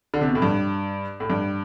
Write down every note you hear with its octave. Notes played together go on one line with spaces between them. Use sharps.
D3
C3
B2
A2
G2
A2
G2